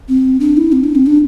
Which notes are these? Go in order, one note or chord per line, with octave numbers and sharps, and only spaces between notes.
C4
D4
E4
C4
D4
C4
D4